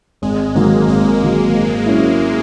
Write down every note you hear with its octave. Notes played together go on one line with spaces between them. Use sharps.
G#1 G#3
G#2 D#3 F#3 A#3
G#1 A#3
G#2 D#3 F#3
G#2
F#3 C#4 E4